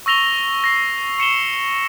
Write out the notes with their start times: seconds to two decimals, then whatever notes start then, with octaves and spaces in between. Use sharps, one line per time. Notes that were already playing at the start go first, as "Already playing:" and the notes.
0.06 C#6 E6 A#6 F7 G7
0.64 A#6 C7
1.18 C#6 C#7 E7 G7